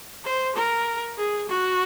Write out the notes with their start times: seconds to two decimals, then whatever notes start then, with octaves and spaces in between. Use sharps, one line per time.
0.25 C5
0.55 A#4
1.17 G#4
1.49 F#4